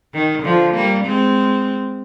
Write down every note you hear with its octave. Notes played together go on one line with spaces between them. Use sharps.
D#3
D3 F3
G3 A#3
G#3 C4